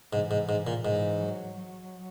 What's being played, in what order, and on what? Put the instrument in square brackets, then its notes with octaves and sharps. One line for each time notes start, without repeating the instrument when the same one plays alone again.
[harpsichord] G#2 [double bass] E3
[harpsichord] G#2
G#2
A#2
[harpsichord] G#2 [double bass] E3
[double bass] F#3
F#3